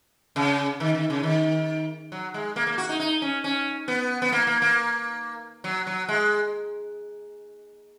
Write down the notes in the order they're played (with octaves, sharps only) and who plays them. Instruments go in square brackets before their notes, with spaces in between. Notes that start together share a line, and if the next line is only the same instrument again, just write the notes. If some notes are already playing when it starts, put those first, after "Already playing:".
[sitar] C#3
D#3
D#3
C#3
D#3
F#3
G#3
A#3
A#3
F#4
D#4
D#4
C#4
C#4
B3
B3
A#3
A#3
A#3
F#3
F#3
G#3